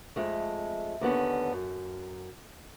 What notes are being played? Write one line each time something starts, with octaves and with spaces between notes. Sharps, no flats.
F2 G#3 A3
D#2 D3 B3 C#4
F#2